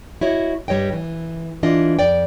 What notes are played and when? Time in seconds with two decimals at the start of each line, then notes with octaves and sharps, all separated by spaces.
0.21 E4 F#4 C#5 D#5
0.68 G2 G3 C#5 D#5 G5
0.93 E3
1.63 E3 D4 F4 D#5
1.99 F2 D5 G5